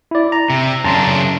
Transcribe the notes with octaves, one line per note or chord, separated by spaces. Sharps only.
E4 D5
A#5
C3
F#2 C#3 D4 A5 A#5 C6